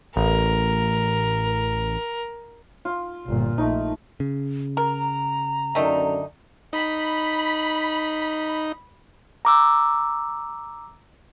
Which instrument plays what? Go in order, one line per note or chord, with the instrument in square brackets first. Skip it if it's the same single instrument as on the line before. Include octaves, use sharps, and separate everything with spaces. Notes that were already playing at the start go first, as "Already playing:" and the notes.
[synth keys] A1 [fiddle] A#4
[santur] F4
[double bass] G1 A#2
[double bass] A#1 [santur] A3 D#4
[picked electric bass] C#3
[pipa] A#4 [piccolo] A#5
[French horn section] F#2 D3 D5 [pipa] D#3 A3 D#4
[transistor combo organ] D#4 [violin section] B5
[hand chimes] A#5 D6 E6